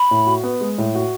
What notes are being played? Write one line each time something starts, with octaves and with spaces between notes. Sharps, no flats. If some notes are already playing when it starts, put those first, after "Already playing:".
Already playing: B5
A2
F#4
B3
G#3
A2
F#4